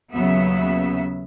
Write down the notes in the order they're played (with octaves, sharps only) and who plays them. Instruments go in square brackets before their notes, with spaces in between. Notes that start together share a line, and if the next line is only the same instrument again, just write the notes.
[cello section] D#2 C#3 F#3 B3 E5